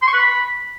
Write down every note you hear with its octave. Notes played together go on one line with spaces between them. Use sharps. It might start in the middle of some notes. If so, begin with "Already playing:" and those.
C6
C#6
B4
B5